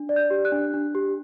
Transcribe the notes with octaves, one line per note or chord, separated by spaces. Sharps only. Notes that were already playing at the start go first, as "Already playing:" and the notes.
Already playing: D4
D5
G6
G4
F#6
D4
D4
G4